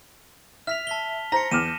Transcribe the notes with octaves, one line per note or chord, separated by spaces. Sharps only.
E5 F6 B6 F7
A5 B6 G7
C5 A#5 A#6 C#7
E2 D6 F6 D#7 E7